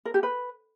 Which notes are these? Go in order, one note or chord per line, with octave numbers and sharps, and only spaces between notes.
A#4
G4
B4